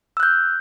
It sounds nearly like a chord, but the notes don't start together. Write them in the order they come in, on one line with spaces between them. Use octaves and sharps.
E6 F#6 G6